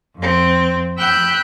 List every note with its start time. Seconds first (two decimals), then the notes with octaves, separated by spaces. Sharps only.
0.16 F2 C4
0.98 G5 B5 E6 F#6 G6